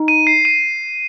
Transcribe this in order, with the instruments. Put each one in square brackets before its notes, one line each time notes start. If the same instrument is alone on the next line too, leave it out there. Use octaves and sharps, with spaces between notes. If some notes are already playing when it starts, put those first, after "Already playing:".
Already playing: [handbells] D#4
[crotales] D#7
C7
D#7